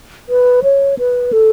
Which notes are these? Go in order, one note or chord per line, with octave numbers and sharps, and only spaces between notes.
B4
C#5
B4
A4